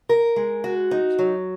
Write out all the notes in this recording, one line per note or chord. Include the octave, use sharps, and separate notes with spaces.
A#4
G#3
F#4
D#4
F#3